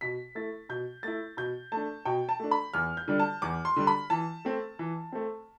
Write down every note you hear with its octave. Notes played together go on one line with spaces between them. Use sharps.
B2 B6
A3 E4 A6
B2 G6
A3 E4 A6
B2 G6
A3 D4 A5
B2 G5
A5
A3 D4
B5
E2 F6
G6
D3 G3 D4
A5
E2 D6
C6
D3 G3 D4
B5
E3 A5
A3 C4
E3
A3 C4